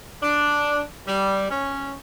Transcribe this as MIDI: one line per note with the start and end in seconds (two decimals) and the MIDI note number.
0.22 0.82 62
1.07 1.49 55
1.50 1.92 61